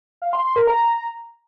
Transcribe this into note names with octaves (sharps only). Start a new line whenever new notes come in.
F5
C6
C6
A#4
A#5